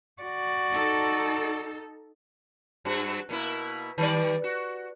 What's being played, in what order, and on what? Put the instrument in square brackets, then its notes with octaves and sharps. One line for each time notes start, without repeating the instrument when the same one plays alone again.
[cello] F#4 D5
[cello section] D#4 A4
[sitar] G2 F#4
B2 A#3 E4
D#3 G3 D5
F#4